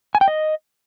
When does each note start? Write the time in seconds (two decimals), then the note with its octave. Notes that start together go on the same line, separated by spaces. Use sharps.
0.15 G#5
0.21 G5
0.28 D#5